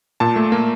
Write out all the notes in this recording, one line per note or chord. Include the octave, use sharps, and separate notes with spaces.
A#2 A5
A3
A#3